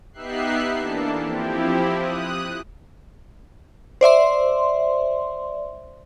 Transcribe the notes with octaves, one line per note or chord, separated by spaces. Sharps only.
B3 D#4 G4 E5 F#6 C7
E3 A#3 D4 A4
F3 C4 E4 G4
D#6 F#6
C5 D5 E5 C6